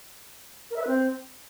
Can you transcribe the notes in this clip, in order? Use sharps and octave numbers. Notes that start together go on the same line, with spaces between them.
A#4
E5
B4
C4